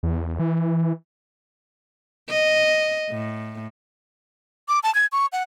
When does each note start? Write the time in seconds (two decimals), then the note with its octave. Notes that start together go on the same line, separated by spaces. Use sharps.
0.03 E2
0.39 E3
2.29 D#5
3.10 A2
4.68 D6
4.83 A5
4.95 G#6
5.12 C#6
5.32 F#5